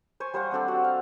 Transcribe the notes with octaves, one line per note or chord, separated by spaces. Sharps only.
C5 G#5 C#6
G3 C5 F5 F#5
C4 D4 A4 D5
F#4
F5